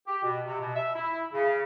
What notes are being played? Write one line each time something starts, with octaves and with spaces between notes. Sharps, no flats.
G4
B2
C3
B2
E5
E4
C#3